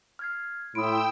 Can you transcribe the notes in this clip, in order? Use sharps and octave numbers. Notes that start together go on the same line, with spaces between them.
F6 G#6 C7
A2 E4 G5 B5 C6 D#6 E6 D7